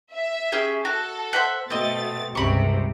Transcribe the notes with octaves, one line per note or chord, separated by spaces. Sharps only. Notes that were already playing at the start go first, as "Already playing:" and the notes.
E5
C#4 G4 G#4
F#4 A4
C5 E5 F#5
B2 A3 C4 D#5 A6
C#2 G2 C3 B5 C#6